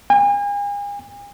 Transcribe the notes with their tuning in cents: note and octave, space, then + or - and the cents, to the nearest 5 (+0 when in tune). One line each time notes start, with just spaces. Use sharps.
G#5 -40